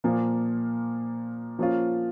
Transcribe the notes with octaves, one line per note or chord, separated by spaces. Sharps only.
A#2 F3 A#3
F3 A#3 C#4 F4